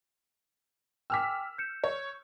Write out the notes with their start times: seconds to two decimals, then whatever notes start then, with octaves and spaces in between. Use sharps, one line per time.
1.10 G5 G#5 D6 E6 F6 B6
1.58 G6 C#7 E7
1.84 C#5